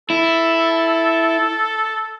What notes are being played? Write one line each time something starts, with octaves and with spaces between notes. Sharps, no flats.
E4 A4